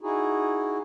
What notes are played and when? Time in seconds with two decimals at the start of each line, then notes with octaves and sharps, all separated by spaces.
0.01 D#4 E4 F#4 G#4